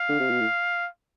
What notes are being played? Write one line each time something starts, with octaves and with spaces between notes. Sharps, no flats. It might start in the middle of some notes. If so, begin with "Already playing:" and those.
Already playing: F5
D3
C3
B2
A2